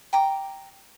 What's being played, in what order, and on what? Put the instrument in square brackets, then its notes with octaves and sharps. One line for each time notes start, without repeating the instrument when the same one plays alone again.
[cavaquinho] G5 A#5 D6